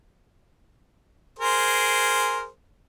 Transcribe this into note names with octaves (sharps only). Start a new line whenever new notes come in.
G#4 A#4 C5